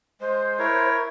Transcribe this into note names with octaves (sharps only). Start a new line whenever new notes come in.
G#3 C5
E4 A#4 C#5